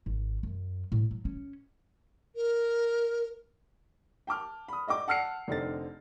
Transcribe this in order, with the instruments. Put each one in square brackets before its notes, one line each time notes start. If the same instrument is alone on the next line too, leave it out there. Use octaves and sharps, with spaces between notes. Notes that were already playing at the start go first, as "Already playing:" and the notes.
[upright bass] G#1
F#2
A2
F#3
C#4
[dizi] A#4
[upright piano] G5 A5 D6 F6
B5 D#6
D5 D#5 G5 D6
F#5 A5 E6 F6 C7 C#7
F1 D3 C4 D#4 A6